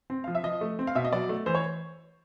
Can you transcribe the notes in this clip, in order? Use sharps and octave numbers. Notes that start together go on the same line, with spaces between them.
C4
F3 F5
E5
F3 D#5
A3
C4
F5
B2 E5
D#5
F#3 D5
A3
E3 C5
C#5